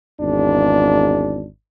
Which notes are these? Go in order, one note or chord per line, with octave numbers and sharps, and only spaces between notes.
G#1 E2 D4